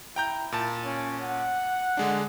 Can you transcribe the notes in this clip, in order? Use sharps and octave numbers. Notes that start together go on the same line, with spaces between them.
E4 G5 A#5 G6
A#2 A5
C#4
F#5
D3 G#3 D4